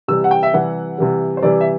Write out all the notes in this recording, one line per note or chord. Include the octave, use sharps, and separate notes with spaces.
C3 E3 G3 E6
F#5
G5
E5
C3 E3 G3 F#5
C3 E3 G3
C5
C3 E3 G3 D5
E5